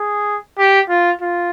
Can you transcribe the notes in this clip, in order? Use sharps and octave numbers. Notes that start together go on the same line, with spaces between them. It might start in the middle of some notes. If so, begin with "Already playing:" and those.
Already playing: G#4
G4
F4
F4